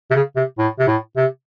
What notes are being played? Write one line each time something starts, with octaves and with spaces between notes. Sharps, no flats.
C3
C#3
C3
A2
C3
A2
C3